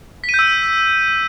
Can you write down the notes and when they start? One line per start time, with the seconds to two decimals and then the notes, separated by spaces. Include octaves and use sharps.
0.24 B6
0.29 D#7
0.34 G6
0.39 E6